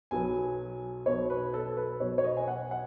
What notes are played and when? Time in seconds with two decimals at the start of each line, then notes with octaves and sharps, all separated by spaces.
0.11 B1 B2 F#3 B3 G#5
1.06 B1 B2 F#3 B3 C#5
1.30 B4
1.54 A4
1.77 B4
2.00 B1 B2 F#3 B3 C#5
2.18 C#5
2.24 D#5
2.37 G#5
2.48 F#5
2.71 F#5